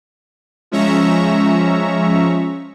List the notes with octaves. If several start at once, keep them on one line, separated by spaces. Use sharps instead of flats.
F3 G#3 C#4 E5 A#5 C#6